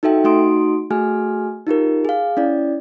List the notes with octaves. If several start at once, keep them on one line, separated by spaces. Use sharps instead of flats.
D#4 F#4 A4 E5 G5
A3 D#4 F#4 C6 D#6 D7
A3 F#4 G#4 G#5 F6
D#4 F4 G4 A#4
G#4 F5
C#4 E4 D5